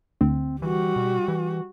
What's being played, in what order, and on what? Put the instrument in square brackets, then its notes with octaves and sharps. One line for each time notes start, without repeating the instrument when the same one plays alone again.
[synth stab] D2 [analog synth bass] C4
[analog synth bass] E3 [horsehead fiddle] G3 F#4
[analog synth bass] B2
E3